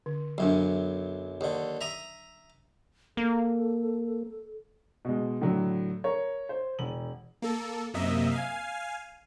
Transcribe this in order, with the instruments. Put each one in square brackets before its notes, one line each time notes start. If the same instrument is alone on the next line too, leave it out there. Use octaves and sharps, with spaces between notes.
[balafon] D3
[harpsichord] B1 F#2 [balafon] F#3 D4
[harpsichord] D#2 D3
E5 A#5 D#6
[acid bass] A#3 [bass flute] A4
[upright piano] B2 G#3
A2 D3 F#3
A#4 C#5
C5
E1 F#7
[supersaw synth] A#3 A4
F#2 C3 A#3 D#5 E5
F5 G#5